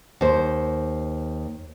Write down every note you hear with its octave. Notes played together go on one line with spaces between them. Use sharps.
D#2 C5